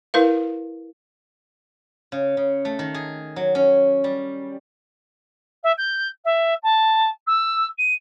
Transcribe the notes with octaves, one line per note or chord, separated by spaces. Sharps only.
E4 A#4 B4 F5
C#3
C#3
A3
D#3
G#4
F#3
C#4
G3
E5
G6
E5
A5
E6
D#7